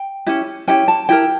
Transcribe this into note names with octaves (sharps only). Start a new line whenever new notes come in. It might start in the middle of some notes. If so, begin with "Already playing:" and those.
Already playing: G5
C#4 E4 G4
C#4 E4 G4 G5
A5
E4 G4 A#4 G5